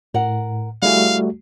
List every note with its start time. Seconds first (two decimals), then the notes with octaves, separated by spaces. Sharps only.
0.14 A2 A#4 F#5
0.82 G3 A3 E4 F#4 G#4 F5